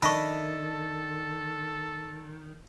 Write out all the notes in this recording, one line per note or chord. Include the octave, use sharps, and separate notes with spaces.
D#3 D4 A4 D#5 E5 B5 C#6